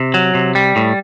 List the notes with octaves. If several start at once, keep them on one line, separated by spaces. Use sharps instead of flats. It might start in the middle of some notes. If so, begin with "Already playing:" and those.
Already playing: C3
F#3
C3
G3
A2